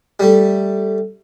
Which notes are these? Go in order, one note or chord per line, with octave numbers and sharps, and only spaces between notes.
G3 A3